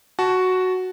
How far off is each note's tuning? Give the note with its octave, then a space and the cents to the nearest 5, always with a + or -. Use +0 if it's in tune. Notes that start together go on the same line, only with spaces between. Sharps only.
F#4 +0 A5 -15